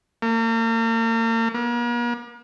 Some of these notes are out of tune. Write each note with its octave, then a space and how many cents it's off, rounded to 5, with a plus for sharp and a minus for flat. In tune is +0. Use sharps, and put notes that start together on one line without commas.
A#3 -40
A#3 +45